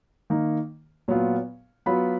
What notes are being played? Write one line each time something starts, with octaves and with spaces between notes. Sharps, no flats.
D#3 A#3 D#4
A#2 F#3 B3 F4
F#3 B3 F4 B5